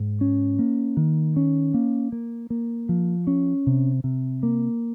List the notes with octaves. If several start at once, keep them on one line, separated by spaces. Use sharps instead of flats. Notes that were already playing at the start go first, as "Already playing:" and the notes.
Already playing: G#2
C#4
A#3
D#3
C#4
A#3
A#3
A#3
F3
C#4
C3
C3
A#3